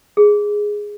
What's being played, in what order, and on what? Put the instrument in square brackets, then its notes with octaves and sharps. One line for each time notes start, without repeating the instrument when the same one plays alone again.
[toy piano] G#4